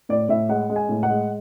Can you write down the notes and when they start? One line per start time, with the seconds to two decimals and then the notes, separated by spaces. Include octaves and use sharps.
0.09 A2 D5
0.29 A2 E5
0.49 G#3 F#5
0.69 G#3
0.76 G#5
0.89 A2
1.03 F#5
1.10 G#3